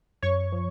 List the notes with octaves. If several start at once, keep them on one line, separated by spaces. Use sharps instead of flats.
F#2 C#5 C#6
F3